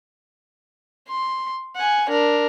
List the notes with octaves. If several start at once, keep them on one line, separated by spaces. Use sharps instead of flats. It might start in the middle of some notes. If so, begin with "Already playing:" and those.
C6
F#5 G#5
D4 A#4